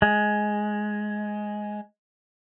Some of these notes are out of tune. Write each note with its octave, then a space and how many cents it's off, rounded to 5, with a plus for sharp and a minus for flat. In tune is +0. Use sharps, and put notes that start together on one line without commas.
G#3 +10